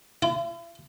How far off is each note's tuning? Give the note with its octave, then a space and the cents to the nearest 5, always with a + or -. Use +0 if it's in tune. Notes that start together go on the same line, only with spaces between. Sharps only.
E4 +45